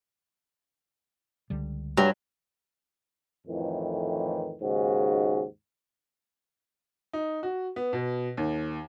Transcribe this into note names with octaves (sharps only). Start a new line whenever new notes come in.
C#2 D3 G3
G2 F#3 G3
F2 A2 D#3 E3
D#2 G#2 C#3 F#4 G#4
D#4
F#4
B3
B2
D#2